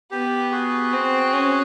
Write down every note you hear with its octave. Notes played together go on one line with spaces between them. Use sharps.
B3 G4
F#4 G#4
C4
C#4